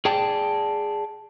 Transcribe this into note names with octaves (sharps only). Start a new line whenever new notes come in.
G#4 D5 G5 A5